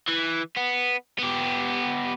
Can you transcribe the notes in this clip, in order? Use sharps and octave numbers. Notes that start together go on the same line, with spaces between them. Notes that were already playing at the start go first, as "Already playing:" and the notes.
E3
B3
B3 G4